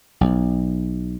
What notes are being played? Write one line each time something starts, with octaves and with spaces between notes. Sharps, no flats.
B1